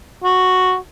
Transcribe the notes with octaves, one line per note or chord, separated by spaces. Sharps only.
F#4